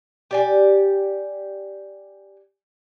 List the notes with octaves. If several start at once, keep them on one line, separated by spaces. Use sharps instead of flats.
G4 D5 G#5